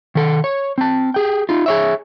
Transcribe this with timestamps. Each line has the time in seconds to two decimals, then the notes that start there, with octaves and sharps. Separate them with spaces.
0.15 D#3 A4
0.44 C#5
0.78 C4 A5
1.14 G4 G#4 G5
1.49 D#4 F4
1.66 G#4 C#5 E5